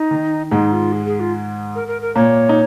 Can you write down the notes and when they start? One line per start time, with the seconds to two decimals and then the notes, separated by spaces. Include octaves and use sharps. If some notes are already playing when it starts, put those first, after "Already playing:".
Already playing: D#4
0.11 D#3
0.51 G#2 G#3 D#4
0.72 F4
0.92 G#4
1.06 G#4
1.20 F4
1.75 A#4
1.88 A#4
2.02 A#4
2.16 A#2 A#3 C#5
2.49 D#4